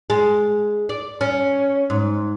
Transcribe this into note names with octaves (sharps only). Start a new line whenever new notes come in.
G#3
D5
C#4
G#2